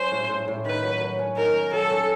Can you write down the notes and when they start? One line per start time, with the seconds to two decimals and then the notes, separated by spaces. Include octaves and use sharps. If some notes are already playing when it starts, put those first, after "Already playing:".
Already playing: F#3 C#4 C5
0.12 A2
0.29 A2
0.48 A2
0.65 D#3 B4
0.84 F#3
1.01 F#3
1.19 C#4
1.37 D#3 A#4
1.55 C#4
1.73 F#3 A4
1.91 C#4